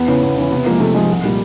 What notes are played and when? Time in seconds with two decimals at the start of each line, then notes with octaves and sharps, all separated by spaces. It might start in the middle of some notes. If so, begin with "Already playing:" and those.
Already playing: E2 B3
0.08 C#3 E3
0.23 E2
0.37 C#3 E3
0.51 C3 B3
0.66 F3 G#3 A#3
0.80 C3 A3
0.94 F3 G#3
1.10 C2
1.23 A#2 G3 A#3